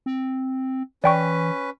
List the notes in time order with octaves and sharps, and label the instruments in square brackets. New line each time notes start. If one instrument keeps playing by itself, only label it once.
[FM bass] C4
[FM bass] E3 [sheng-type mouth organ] C#4 B4 [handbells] D5 G5 C#6